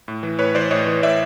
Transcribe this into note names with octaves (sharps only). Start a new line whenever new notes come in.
A2
E3
A2 B4 C#5
E3 C5 D5
A2 C#5 D#5
E3
A2 D5 E5